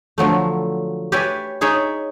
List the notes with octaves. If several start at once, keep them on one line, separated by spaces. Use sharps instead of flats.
D3 F3 F#3 A3
G4 B4 C#5 D5 E5 G#5
D#4 G#4 C#5 D5 E5